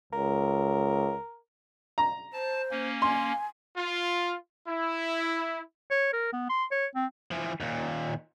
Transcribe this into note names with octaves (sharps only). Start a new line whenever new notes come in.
C#2 A#4
A#5
C5 A5
A#3 C#4
G#5 C6
F4
E4
C#5
A#4
B3
C6
C#5
C4
E3 F3
D#2 A#2